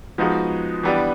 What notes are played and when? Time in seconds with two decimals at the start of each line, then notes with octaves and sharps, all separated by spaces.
0.18 F3 G#3 B3 D#4 F#4
0.83 E3 G3 B3 D4